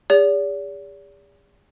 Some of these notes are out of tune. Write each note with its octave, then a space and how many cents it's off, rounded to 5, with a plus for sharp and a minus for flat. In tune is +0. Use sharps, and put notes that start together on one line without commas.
G#4 -45 D5 -40